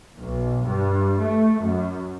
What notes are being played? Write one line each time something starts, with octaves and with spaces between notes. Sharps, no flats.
B1
G2
A3
F#2